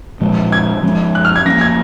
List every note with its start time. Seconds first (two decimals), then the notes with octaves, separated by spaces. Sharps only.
0.21 A#2 F3 G#3
0.52 G#6
0.83 F3 G#3 C#4
1.15 F#6
1.25 F6
1.36 G#6
1.45 F3 A#3 C#4 A#6
1.61 G#6